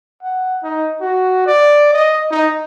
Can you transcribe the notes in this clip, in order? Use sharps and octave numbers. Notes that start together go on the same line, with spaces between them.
F#5
D#4
F#4
D5
D#5
D#4